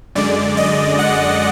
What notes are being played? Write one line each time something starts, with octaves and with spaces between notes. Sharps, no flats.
F#2 D3 G#3 D5
D#5
F#5